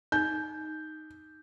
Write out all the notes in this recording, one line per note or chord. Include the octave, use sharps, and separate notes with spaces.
D#4 G6